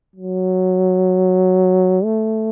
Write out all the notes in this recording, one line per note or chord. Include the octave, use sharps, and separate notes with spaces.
F#3
A3